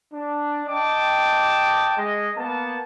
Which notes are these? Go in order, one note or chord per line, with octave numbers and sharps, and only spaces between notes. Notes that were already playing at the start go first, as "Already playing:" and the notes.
D4
D#5 G5 A5 D6
G#3 D#5
A#3 B3 A5